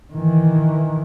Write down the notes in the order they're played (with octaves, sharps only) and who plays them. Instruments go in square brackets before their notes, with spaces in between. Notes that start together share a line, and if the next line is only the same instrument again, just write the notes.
[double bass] D#3 E3